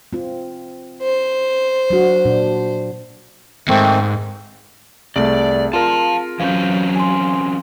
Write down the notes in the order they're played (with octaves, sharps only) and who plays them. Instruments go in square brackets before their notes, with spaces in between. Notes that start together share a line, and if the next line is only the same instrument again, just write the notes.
[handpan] C4 F4
[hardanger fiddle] C5
[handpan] F#3 D4 F#4
A#2 D4
[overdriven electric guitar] D#2 G#2 [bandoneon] D#3 A3 C4
[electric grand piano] C2 A3 [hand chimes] C4 G#4 [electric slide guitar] D5
[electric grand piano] F4 A#4 [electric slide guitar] F5 A5
[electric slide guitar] E3 C4 C#4 [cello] F#3 [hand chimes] F5 G6
[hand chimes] G#5 C6